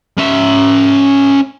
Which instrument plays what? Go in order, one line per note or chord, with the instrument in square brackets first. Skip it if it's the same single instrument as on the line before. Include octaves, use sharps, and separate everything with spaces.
[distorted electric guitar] C#4 E5